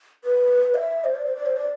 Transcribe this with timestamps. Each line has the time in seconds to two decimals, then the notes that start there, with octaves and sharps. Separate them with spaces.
0.24 B4
0.75 F5
0.78 E5
1.04 C5
1.15 D5
1.25 C5
1.36 D5
1.46 C5
1.56 D5